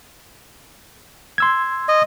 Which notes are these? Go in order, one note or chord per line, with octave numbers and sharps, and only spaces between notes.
C6 E6 G#6
D#5